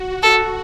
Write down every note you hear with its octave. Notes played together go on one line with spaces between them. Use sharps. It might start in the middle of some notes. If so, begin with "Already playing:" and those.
Already playing: F#4
A4